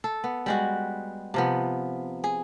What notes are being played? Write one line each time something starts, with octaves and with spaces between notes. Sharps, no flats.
A4
B3
G3 G#3 F#4
C3 F3 B3
G#4